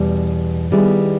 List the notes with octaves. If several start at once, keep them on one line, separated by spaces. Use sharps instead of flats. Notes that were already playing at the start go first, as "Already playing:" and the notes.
Already playing: E2 B2 G3
D#3 G3 B3 E4 G#4